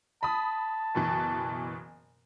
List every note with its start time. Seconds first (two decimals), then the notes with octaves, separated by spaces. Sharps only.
0.23 A5 B5 D#6
0.95 F#1 B2 E3